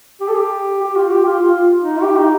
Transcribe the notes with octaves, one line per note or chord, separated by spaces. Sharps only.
G4
A4
G4
G4
F4
G4
F4
F4
D#4
G4
D#4